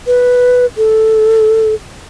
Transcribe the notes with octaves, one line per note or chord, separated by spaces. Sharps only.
B4
A4